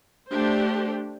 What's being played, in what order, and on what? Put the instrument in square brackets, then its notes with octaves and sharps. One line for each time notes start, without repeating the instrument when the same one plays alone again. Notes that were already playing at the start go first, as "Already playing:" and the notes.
[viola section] A3 D4 G4 C5